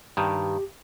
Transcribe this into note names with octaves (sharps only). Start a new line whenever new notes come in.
G2 D#3 G4